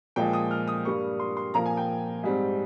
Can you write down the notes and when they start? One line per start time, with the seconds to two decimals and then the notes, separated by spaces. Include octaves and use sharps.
0.16 A#2 F3 G#3 G5
0.33 D#6
0.51 F6
0.68 D#6
0.85 G2 G3 A#3 C#6
1.20 C6
1.37 C6
1.54 A#2 F3 A#3 A#5
1.66 G#5
1.77 G5
2.23 G#2 G3 C4